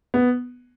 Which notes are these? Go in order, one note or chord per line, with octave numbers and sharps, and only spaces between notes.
B3